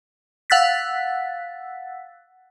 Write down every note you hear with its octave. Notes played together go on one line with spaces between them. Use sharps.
F5 F#5 E6 F#6 A6 B6